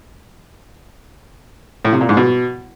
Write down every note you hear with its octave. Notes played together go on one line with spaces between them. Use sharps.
A2
C3
A#2
G#2
B2